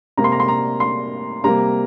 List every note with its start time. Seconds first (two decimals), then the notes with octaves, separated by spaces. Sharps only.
0.17 C3 A#3 A#5
0.24 C6
0.32 A#5
0.40 C6
0.48 A#5
0.80 C6
1.44 C3 G3 A#3 A#5